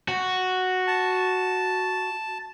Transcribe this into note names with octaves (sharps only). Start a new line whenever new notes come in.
F#4
A5